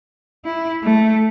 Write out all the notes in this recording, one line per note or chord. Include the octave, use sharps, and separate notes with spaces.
E4
A3